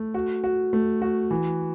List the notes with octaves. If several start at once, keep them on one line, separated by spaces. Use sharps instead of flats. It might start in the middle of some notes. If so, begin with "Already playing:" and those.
Already playing: A3
F#4
F#4
A3
F#4
E3